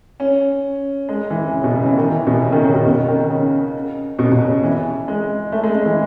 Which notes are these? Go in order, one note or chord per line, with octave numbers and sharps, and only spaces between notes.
C#4
G#3
E3
C#3
B2
C#3
E3
D#3
E3
B2
C#3
D#3
C#3
B2
B2
D#3
C#3
B2
B2
C#3
E3
G#3
A3
G#3
G#3
E3